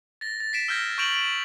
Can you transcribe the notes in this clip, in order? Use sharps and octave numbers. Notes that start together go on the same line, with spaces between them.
A6 A#6
A6
B6 C7 D7 E7
E6 F6 G6 G#6 A#6
C#6 G6 D7 F7 F#7
D7